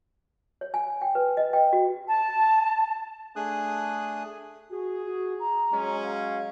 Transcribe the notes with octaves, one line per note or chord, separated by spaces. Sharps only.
C#5
G#5
G5
B4
D#5
G5
F#4
A5
A3 D4 G#4 G#5 D#6 F#6
F#4 G#4
F#4
A#5
F#3 G#3 C#4
F5